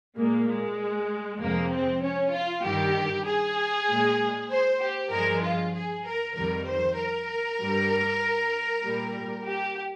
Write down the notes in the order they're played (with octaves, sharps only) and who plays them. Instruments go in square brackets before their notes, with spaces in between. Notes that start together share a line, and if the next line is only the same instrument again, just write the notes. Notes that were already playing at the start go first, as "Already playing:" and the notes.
[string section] A#2 G#3 A#3
G#3
F2 C3 F3 G#3 A#3
C4
C#4
F4
G2 D#3 G3 G4
G#4
A#2 G#3
C5
G4
G2 F3 G#3 A#4
F4
G#4
A#4
F2 D#3 G3 A#4
C5
A#4
G2 G3
A#2 G3
G4